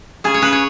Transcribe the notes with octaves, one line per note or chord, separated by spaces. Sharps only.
C#3 G#4
C#5
C#3 B4
C#5